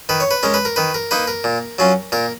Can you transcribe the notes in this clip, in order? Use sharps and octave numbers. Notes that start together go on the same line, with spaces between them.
D#3 B4
C#5
B4
G#3 C#4 A#4
B4
A#4
D#3 B4
A#4
A#3 D#4 B4
A#4
A#2
F#3 C#4 F4
A#2 A#4